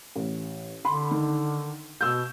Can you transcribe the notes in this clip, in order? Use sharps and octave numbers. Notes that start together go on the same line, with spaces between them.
A1
D3 B5 C6
D#3
B2 E6 G6